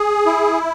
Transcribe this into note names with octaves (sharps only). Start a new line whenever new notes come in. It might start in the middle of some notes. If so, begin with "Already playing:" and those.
Already playing: G#4
E4